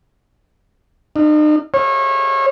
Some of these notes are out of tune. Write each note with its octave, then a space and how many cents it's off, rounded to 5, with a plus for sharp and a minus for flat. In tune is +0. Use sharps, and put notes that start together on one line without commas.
D#4 -45
C#5 -30